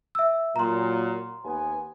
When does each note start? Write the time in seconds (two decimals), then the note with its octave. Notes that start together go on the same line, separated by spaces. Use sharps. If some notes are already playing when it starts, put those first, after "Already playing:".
0.15 E5 E6
0.56 A#2 F#3 A#5 C6
1.45 D#2 B3 G#5